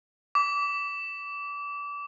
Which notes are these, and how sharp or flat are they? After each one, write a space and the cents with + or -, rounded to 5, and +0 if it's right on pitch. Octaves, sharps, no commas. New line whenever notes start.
D6 -30